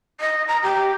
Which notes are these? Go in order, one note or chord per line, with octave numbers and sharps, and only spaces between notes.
D#5
A#5
G4